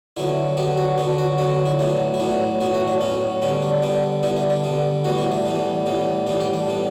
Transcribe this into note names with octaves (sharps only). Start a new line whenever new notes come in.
D3 F#3 B3 E4
D3 F#3 B3 G4
F#4
D3 F#3 B3 D4
F#4
D3 F#3 B3 F#4
E4
A2 F#3 B3 D4
E4
A2 F#3 B3 D4
A2 F#3 B3 E4
F#4
D4
A2 F#3 B3 C#4
D3 G3 B3 C#4
D4
D3 G3 B3 D4
D3 G3 B3 E4
D4
D4
D3 G3 B3
A2 E3 G3 B3 F#4
E4
D4
A2 E3 G3 B3
A2 E3 G3 B3
A2 E3 G3 B3 D4
G4
D4
A2 G3 B3